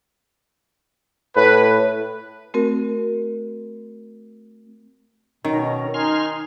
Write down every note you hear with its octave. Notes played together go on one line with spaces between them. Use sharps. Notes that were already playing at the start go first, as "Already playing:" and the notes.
A2 B4
A3 C4 F#4 A#4
B2 D#3 C#4 A#4
D#4 G#5 C6 F6